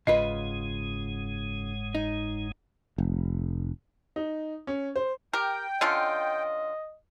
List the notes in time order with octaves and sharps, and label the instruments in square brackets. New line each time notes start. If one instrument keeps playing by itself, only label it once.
[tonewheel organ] F#1 G#2 G#3 [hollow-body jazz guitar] C#3 F4 B4 [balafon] D#5
[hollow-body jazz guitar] D#4
[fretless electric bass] F1
[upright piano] D#4
C#4
C5
[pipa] G4 A#4 [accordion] G5
[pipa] D3 C#4 F4 [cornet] D#5